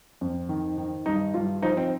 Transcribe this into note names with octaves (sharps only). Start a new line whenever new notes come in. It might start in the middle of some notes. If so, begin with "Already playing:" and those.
F2
D#3
D#3
G2 D#4
G2 F4
F3 D#4
C4